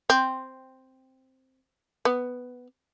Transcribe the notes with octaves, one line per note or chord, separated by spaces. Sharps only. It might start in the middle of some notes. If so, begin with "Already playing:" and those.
C4
B3